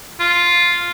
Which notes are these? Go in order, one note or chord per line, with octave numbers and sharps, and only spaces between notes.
F4